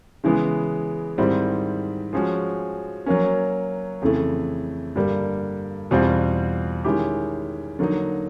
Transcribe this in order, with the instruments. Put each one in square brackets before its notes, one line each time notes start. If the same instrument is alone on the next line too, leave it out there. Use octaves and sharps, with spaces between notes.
[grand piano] C#3 E3 G#3 B3
G#2 D#3 G3 C4 E4
F3 G#3 C#4 F#4
F#3 A#3 C#4
F2 C#3 E3 A3
G2 D3 G3 A#3
E2 B2 G3 C4 F4
D#3 G#3 C#4 E4 G4
D3 F#3 A#3 D#4